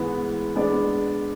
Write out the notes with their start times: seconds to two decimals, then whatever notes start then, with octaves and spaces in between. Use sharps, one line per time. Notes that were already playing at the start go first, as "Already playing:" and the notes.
Already playing: G#2 E3 G#3 B3
0.55 G#3 B3 D4 G#4 D5